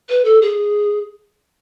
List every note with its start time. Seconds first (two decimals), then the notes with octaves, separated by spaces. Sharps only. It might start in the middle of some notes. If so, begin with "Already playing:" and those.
0.09 B4
0.25 A4
0.42 G#4